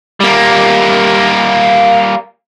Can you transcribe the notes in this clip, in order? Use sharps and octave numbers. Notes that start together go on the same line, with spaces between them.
G3 A#3